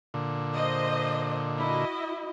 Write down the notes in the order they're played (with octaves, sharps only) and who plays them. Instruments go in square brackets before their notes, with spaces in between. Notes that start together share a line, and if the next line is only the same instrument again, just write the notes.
[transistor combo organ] A#2 D3
[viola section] C5 D#5
E4 F#4 D#5